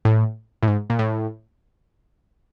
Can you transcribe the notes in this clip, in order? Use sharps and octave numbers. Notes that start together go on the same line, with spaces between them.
A2
A2
G#2
A#2
A2